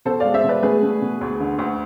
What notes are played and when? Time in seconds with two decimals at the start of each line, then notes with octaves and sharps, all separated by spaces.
0.05 B2 A4 C5
0.20 G#3 D5 F5
0.34 C5 E5
0.44 B2
0.49 B4 D5
0.63 A3 G#4 B4
0.83 A3
1.02 B2
1.21 D2
1.40 D3
1.59 D2